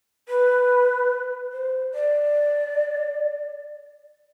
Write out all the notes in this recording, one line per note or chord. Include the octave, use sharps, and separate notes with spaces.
B4
C5
D5